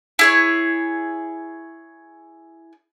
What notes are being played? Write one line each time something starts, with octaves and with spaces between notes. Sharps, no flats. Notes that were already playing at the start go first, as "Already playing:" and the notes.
E4 G#4 C#5